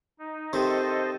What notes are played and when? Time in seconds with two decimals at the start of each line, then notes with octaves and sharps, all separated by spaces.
0.19 D#4
0.53 C3 D#3 C4 A4 C5 D#5